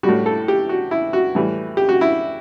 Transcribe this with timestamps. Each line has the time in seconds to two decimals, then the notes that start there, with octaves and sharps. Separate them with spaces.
0.03 G3 F#4
0.08 A2
0.26 A4
0.48 G4
0.69 F#4
0.91 E4
1.13 F#4
1.35 A2 E3 G3
1.77 G4
1.89 F#4
2.01 E4